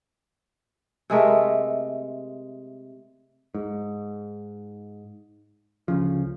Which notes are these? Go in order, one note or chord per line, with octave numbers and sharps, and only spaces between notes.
C3 G#3 A3 A#4
G#2
D2 C#3 F3